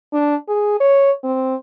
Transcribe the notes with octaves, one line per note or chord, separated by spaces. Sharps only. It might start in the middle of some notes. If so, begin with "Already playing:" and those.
D4
G#4
C#5
C4